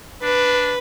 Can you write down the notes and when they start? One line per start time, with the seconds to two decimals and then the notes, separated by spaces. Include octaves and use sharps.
0.23 D4 B4